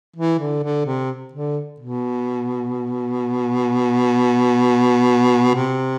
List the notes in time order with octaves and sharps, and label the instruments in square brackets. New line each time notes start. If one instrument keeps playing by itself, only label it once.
[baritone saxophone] E3
D3
D3
C3
D3
B2
C3